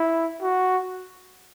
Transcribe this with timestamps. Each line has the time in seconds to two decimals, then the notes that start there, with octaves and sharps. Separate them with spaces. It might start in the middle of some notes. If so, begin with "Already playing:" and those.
Already playing: E4
0.42 F#4